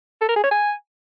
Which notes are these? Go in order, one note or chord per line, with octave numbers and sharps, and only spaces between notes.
A4
A#4
G#4
C#5
G#5